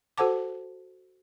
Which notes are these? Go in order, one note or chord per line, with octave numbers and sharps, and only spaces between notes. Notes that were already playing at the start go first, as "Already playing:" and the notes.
F#4 A4 C5 F#5 A5 D6